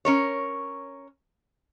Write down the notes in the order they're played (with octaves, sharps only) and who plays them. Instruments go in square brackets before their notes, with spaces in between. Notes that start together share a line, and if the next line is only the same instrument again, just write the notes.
[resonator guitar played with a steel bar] C#4 A#4 C#5